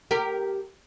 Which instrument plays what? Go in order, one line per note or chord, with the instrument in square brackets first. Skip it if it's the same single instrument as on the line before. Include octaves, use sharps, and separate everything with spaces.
[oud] G4 A#4